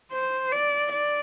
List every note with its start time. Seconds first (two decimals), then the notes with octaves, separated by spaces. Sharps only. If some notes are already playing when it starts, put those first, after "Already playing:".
0.12 C5
0.52 D5
0.92 D5